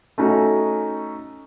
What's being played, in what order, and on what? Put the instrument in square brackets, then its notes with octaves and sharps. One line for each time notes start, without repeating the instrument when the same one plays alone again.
[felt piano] A3 C#4 D#4 F#4